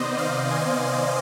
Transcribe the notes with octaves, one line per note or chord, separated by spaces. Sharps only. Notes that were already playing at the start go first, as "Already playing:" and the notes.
Already playing: C3 D#3 B3 C5 D5 D#5
D5 F5
G#5 C6